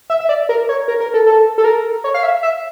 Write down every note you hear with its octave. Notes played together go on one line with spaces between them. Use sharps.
E5
E5
D5
A#4
C#5
A#4
A#4
A4
A4
A4
A#4
C#5
F5
E5
E5